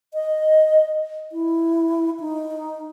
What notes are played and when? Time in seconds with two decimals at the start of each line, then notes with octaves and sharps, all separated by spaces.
0.14 D#5
1.32 E4
2.20 D#4